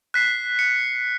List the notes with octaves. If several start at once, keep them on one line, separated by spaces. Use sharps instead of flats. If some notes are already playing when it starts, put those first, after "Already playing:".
F#6 B6 C7
C#7